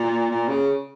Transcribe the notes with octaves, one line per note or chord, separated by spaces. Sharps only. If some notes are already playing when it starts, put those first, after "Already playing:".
Already playing: A#2
A#2
C#3